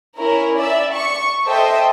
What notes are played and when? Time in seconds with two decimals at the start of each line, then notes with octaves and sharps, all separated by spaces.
0.17 C#4 E4 A#4
0.57 D5 E5
0.94 C#6
1.45 A4 C5 D#5 E5 G5